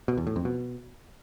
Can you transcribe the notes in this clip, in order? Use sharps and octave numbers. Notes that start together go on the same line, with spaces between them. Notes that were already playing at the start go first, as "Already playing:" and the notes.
B2
E2
A2
F2
B2